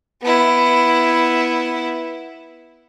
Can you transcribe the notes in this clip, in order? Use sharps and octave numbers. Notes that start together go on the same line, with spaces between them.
B3 E4